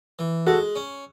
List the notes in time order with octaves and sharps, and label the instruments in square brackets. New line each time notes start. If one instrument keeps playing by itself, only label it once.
[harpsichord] E3
[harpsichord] G#3 [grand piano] F#4 A4
[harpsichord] C#4